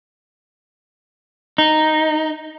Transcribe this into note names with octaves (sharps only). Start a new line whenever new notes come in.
D#4